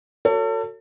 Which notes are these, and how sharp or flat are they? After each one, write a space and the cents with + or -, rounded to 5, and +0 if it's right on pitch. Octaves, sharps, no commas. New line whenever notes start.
F#4 +0 A4 +35 C#5 +20